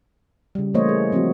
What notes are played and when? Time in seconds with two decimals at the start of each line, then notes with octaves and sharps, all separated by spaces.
0.55 C#3 G3
0.74 E3 A3 A#3 C5 C#5 D#5
0.89 G#4
1.12 F3 C4 E4 F#4